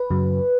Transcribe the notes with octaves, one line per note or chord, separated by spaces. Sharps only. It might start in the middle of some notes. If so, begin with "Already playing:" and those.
Already playing: B4
F#2 C#3 F#3